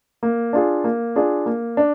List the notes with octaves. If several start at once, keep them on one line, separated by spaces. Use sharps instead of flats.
A#3
D4 F4 G#4
A#3
D4 F4 G#4
A#3
D4